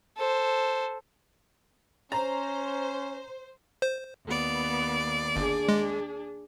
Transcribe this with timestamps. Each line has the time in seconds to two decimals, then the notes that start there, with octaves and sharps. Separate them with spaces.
0.17 A4 C5
2.12 C#4 C5 A#5
3.82 C5
4.28 D#2 B3 D5
5.36 G1 D4 G#4
5.69 G#3